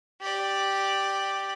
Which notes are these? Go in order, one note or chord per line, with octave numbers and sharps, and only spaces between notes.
G4 D5